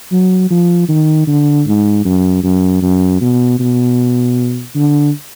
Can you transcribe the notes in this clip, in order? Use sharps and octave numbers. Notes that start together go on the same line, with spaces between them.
F#3
F3
D#3
D3
G#2
F#2
F#2
F#2
B2
B2
D3